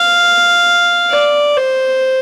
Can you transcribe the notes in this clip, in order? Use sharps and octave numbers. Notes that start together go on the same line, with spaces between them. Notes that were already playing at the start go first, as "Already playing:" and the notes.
Already playing: F5
D5
C5